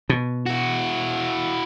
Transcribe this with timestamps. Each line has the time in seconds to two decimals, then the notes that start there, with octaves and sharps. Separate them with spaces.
0.09 B2
0.47 E4 F#4